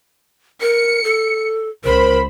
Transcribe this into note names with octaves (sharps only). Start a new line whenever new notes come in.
A#4 C#7
A4
C#2 A#4 C5 B5